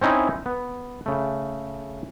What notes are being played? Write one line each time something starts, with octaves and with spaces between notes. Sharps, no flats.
C4 C#4 D#4 E4
B3
C#3 A3